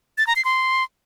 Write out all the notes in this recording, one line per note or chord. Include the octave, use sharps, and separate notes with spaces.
A6
A#5
C7
C6